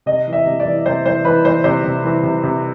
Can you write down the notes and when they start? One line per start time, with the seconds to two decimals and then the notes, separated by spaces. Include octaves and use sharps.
0.06 C3 D#5
0.27 E3
0.33 E5
0.46 C3
0.60 D5
0.65 E3
0.85 C3 C5
1.06 E3 C5
1.25 E3 B4
1.45 E3 C5
1.64 C3 C5
1.84 C3
2.04 E3
2.23 C3
2.43 C3